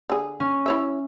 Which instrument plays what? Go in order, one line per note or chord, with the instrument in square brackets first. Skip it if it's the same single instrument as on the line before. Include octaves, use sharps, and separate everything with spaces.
[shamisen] D3 G#4
[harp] C#4
[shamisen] E4 C#5 E5